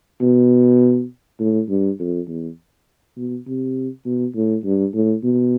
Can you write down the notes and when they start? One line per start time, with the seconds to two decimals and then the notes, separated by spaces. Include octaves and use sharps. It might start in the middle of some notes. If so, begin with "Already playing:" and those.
0.21 B2
1.40 A2
1.69 G2
1.99 F2
2.28 E2
3.16 B2
3.47 C3
4.05 B2
4.35 A2
4.65 G2
4.94 A2
5.23 B2